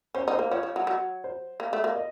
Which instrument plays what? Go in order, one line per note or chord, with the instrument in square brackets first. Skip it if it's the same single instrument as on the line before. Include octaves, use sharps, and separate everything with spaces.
[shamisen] C#4 [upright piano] C5
[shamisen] D#4
[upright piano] C5
[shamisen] A#3
[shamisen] F3 [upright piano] C#5
[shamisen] F3
F#3
F#3
[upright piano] C5
[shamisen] A#3
A3
A#3
[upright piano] D#5